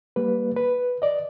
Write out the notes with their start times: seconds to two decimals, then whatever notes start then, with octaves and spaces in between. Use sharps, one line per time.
0.16 G3 A#3 B4
0.56 B4
1.02 D5 D#5